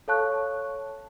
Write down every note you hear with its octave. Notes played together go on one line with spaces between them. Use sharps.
A4 C#5 F5 A5 C#6 F#6